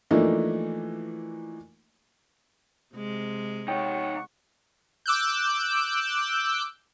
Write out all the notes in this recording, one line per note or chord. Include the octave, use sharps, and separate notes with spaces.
E3 F3 A3 A#3 D4 D#4
C3 G#3
D#4 C#5 F#5 G5 C#6 F#6
D6 E6 F#6 G6